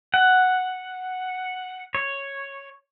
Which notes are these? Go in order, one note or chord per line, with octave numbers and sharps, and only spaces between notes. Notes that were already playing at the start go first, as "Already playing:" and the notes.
F#5
C#5